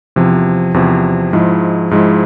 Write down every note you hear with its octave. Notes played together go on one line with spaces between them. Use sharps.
E2 C3 F3
E2 C3 F3
G#2 F3 G#3 E4
G#2 F3 G#3 E4